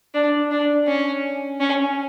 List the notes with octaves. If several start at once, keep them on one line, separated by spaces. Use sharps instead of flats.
D4
D4
C#4
C#4